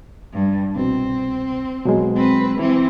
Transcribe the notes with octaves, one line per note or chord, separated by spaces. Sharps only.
G2
C2 B2 C4
B2 F#3 G#3
C4 B4
E3 C4 E4